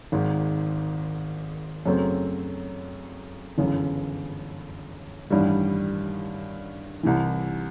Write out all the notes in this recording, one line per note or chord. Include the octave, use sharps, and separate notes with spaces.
G#1 G#2 D#3
F#2 C#3 F#3 A3 C4
G1 F#2 C#3 E3
A1 G2 D#3 G3
C2 C3 E3